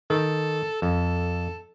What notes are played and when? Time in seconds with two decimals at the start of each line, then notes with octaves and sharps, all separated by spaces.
0.10 D#3 A4
0.82 F2 A4